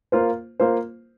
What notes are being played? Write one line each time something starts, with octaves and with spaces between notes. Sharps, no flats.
A#3 F4 C5
A#3 F4 C5